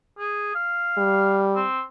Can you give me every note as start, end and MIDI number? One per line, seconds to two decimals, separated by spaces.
0.19 0.52 68
0.55 1.48 77
0.98 1.65 55
1.55 1.82 60